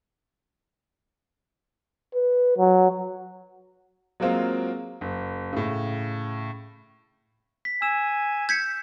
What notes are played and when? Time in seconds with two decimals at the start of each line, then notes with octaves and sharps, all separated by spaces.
2.15 B4
2.58 F#3
4.20 F#3 G#3 A#3 C4 F4
5.01 F#1
5.53 A2 C#3
7.65 B6
7.82 G#5 E6 E7
8.49 G6 G#6 B6 C#7